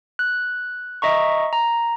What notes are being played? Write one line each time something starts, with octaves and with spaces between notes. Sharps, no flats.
F#6
D#5 E5 A#5 C#6
A#5